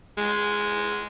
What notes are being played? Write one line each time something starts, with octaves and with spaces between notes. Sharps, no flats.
G#3